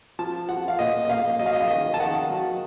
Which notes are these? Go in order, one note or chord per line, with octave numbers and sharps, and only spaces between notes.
F3 A5
F3 F#5
F5
A#2 D#5
D#5
A#2 F5
F#3 D#5
F5
D#5
F5
D#3 D#5
A5
D#3 F#5
F#3